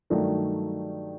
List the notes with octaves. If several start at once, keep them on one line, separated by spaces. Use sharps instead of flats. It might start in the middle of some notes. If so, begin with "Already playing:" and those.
G2 D#3 F#3 A3 D#4